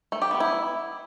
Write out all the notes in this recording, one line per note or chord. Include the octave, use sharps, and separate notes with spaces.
A3
G4
B3
E4